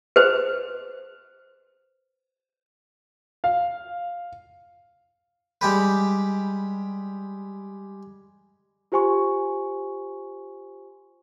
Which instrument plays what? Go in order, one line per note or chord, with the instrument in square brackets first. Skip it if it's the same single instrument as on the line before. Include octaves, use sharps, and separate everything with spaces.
[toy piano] B4 C5
[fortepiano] F5
[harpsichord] G3 G#3 G4 B4
[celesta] F4 G4 C5 G#5 C6 C#6